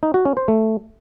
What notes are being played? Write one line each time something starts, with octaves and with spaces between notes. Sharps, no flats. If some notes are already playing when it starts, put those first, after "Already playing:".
D#4
F#4
C#4
C5
A3